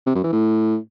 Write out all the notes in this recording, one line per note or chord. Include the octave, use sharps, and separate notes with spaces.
C3
F#2
E3
A2